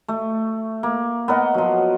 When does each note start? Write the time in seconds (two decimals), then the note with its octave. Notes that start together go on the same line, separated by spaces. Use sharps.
0.08 A3
0.83 A#3
1.28 B3 A#4 D#5 F#5
1.54 F3 F#3